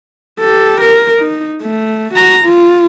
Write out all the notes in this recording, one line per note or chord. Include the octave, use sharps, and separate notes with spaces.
G4 A4
A#4
D#4
A3
F#4 A#5
F4